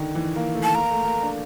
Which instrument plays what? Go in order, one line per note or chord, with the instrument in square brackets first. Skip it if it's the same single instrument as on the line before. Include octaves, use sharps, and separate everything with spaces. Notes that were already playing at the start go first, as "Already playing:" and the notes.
Already playing: [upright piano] D3 D#3
E3
A#3
A3
[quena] A5
[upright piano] A#3 [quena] A#5
[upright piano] A3
A#3
D4